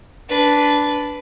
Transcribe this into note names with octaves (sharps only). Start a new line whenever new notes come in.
D4 B4